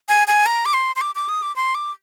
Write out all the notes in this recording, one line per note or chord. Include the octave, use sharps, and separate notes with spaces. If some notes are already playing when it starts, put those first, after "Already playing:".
G#5
G#5
A#5
D6
C6
C6
D6
D6
D#6
D6
C6
D6